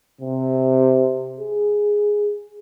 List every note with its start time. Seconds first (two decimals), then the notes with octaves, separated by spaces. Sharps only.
0.21 C3
1.40 G#4